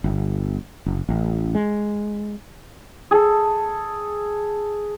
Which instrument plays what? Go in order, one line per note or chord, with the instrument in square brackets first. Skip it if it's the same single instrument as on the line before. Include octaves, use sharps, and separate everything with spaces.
[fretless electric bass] G1
F#1
A1
G#3
[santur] G#4 A4